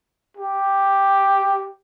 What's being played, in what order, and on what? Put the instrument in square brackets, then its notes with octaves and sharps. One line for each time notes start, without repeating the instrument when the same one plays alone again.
[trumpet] G4